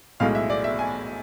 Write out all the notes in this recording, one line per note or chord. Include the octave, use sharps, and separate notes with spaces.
B1 A2 G#3 F5
E5
D5
E5
G#5